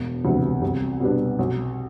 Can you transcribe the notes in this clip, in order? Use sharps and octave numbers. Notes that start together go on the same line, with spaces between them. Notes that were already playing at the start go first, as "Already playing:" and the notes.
Already playing: E1
D2 C3 E3 G#3
C2
B2 G3 B3 D4
B1